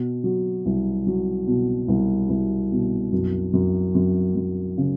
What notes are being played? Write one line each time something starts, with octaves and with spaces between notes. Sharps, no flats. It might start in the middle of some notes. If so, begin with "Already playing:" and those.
Already playing: B2
F#3
C2
F#3
B2
C2
C2
B2
F#2
F#2
F#2
F#2
C#3